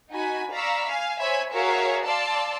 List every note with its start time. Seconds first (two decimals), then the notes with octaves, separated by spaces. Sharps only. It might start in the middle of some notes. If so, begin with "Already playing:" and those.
0.11 D#4 F#4 G#5 B5
0.52 D5 F5 A#5 B5 C#6 E6
0.87 F5 G#5
1.20 C5 C#5 E5 G#5 B5 G#6
1.52 F#4 G#4 A#4 C#5 E5 F5
2.05 D5 F5 A5 C6 E6